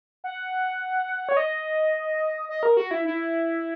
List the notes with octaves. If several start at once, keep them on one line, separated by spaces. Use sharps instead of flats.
F#5
C#5
D#5
D#5
A#4
F#4
E4
E4